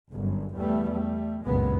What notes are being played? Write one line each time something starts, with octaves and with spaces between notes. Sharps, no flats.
G1 F#2
E2 G3 A3 B3
G3 A3
F#1 C#2 G2 A#2 G#3 B3